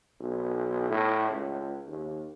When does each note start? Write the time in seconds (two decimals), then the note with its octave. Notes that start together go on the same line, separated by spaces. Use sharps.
0.20 B1
0.89 A2
1.30 C#2
1.87 D#2